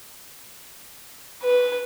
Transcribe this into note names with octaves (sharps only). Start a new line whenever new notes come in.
B4